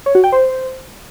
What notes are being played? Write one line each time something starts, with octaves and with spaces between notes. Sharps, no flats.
C#5
F#4
G5
C5